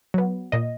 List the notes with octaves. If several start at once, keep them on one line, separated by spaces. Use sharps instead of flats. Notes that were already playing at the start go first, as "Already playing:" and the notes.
F#3 B3
A#2 D#5